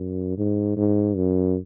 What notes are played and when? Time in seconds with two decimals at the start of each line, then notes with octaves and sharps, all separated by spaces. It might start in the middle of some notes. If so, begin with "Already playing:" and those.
Already playing: F#2
0.38 G#2
0.77 G#2
1.16 F#2